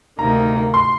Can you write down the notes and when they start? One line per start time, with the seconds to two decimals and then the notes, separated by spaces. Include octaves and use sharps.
0.19 D2 C3 D#3 A#3 D#4 A#5
0.74 C6